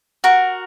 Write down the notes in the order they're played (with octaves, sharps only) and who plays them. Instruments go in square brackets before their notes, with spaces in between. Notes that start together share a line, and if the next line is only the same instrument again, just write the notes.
[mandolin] F#4 A#4